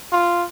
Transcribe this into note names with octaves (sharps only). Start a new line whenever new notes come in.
F4